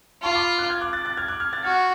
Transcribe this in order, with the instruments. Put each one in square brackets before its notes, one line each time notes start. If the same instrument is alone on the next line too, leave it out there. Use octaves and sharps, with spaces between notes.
[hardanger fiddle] F4 [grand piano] A5 C#6
[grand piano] B5 D6
D6 F#6
F6 G#6
D6 F#6
F#6 A6
F#6 A6
F6 G#6
D6 F#6
F6 G#6
F#6 A6
[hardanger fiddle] F#4 [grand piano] F6 G#6